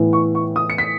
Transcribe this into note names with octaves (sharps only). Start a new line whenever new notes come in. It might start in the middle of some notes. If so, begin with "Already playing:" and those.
Already playing: A2 E3 B3
C#6
C#6
D#6
C#7
B6